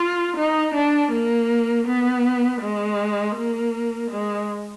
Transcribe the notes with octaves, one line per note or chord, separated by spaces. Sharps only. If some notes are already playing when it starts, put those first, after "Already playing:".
Already playing: F4
D#4
D4
A#3
B3
G#3
A#3
G#3